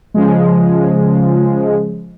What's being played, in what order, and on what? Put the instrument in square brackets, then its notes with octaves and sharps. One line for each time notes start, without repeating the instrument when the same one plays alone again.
[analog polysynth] C#3 F3 G#3